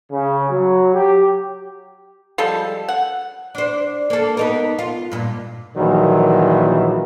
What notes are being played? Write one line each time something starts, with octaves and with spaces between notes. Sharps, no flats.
C#3
F#3
G4
F3 G3 G#3 A4
F#5
D4 C5
A#3 A4
B3 D#4 A#4
F4
G2 A#2
A#1 A#2 D#3 E3 F#3